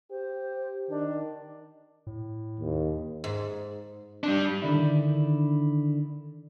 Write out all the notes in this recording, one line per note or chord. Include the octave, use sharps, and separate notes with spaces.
G4 C5
D#3 D4
A2
D#2
G#2
G3 D4
D3 D#3 D4 E4